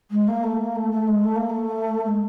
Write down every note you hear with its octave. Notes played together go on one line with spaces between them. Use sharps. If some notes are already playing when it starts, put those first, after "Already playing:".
G#3
A#3
A3
A#3
A3
A3
G#3
A3
A#3
A3
G#3